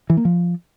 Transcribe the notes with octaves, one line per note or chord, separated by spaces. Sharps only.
E3
A#3
F3